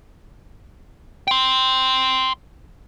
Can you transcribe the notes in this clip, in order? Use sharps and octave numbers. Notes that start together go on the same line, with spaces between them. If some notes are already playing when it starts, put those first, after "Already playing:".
G5 C6